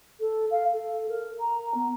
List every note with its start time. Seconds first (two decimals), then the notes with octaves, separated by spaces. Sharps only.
0.20 A4
0.50 F5
0.72 A4
1.08 A#4
1.40 A#5
1.74 B3